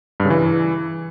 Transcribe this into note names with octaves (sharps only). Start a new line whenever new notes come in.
G2
C#3
E3